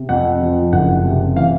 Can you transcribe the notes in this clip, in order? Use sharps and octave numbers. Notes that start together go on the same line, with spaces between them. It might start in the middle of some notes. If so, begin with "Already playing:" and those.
Already playing: C3
F2 F#5
F3
F#1 F#5
C3
E3 F5